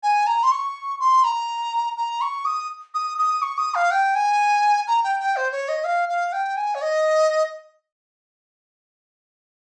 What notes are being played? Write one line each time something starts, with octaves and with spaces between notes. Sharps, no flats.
G#5
A#5
C6
C#6
C6
A#5
A#5
C#6
D#6
D#6
D#6
C#6
D#6
F5
G5
G#5
A#5
G5
G5
C5
C#5
D#5
F5
F5
G5
G#5
C#5
D#5